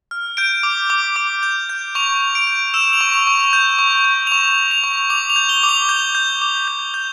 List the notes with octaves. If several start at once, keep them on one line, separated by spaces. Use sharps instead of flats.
F6
G6 D7
D6
D6
D6
G6
G6
C#6 F7
C#6
D7
G6
E6 E7
F7
C#6
F7
C#6
G6
C#6
C#6
F7
C#6 E7
G6
F7
C#6
D6 F7
F7
G6
G7
D6
F7
G6
G6
D6
G6
G6